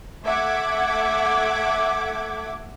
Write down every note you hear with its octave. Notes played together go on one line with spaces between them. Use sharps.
A3 E5 F#5 D6 G#6